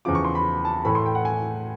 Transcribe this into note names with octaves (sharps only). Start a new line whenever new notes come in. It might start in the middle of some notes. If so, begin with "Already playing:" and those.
E2 C#3 F3 D6
C#6
C6
B5
A5
A2 E3 A3 B5
C6
G5
F#5
G#5